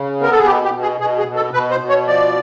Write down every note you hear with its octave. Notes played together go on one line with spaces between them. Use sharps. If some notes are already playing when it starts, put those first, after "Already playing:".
Already playing: C#3
B3 A#4
A4
G#4
B2 G4
G4
B2
G#4
B2 G#4
G#4
B2
A4
B2 B4
C5
B2
C#5
F3 D5